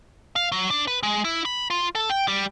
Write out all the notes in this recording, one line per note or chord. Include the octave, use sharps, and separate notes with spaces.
F5
F#3
D4
B4
G#3
E4
B5
F4
A4
G5
G3